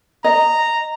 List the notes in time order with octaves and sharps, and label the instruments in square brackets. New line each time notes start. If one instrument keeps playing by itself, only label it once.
[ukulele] D#5 [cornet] A#5